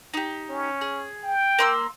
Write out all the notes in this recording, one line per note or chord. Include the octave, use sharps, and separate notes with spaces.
D#4 G4
C#4
G#4
G5
A#3 C6 E6